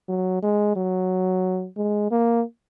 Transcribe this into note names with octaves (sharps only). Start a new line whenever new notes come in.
F#3
G#3
F#3
G#3
A#3